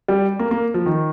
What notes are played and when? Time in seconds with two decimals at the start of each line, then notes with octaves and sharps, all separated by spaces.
0.08 G3
0.39 A#3
0.51 A#3
0.74 F3
0.86 D#3